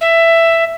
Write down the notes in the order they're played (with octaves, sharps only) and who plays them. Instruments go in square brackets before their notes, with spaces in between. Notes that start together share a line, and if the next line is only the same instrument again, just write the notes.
[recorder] E5